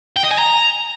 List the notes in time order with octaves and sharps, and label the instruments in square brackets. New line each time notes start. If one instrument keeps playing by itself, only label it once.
[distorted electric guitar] G5
D#5
G#5
A#5